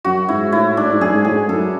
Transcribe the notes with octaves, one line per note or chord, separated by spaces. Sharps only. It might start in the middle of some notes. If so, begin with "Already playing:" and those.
F#2 F#4
G#2 E4
A2 E4
G#2 D4
A2
G#2
F#2 G#4
G#2
A2 G#4
G#2
F#2 A4